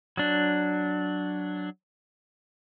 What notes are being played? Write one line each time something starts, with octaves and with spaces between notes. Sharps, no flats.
F#3 D4